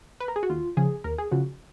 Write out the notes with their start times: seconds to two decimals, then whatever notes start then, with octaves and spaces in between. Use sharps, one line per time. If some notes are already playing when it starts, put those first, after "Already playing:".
0.20 B4
0.28 A#4
0.36 G#4
0.43 F#4
0.49 D#2 F4
0.77 C#3 F3 G#4
1.04 D#2 A#4
1.18 G#4
1.31 C#3 F3 F#4